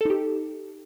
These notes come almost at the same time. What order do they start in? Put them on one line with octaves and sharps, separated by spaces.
A4 D#4 G4